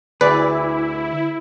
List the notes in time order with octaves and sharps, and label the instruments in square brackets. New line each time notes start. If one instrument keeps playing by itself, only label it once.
[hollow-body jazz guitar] D2 G#4 D5 [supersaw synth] E4 [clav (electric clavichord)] B4